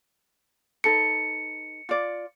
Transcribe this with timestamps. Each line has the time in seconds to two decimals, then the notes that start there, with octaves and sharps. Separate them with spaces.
0.84 D#4 A4 B4 C#7
1.89 F4 D5